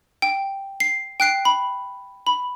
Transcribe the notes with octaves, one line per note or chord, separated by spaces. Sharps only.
G5
C7
G5 F#6 C7 D7
B5
B5